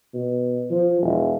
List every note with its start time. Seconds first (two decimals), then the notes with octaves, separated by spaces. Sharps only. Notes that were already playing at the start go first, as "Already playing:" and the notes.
0.14 B2
0.70 F3
1.02 E1